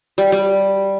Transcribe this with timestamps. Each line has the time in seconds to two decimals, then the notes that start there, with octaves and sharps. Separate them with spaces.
0.18 G3
0.32 G3